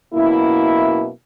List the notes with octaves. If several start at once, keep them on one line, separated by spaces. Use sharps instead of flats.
F#2 B2 A#3 E4